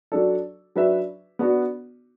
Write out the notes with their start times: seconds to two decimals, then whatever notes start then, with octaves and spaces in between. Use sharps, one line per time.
0.12 F#3 D4 A4
0.76 F#3 D4 B4 E5
1.39 B3 D4 F#4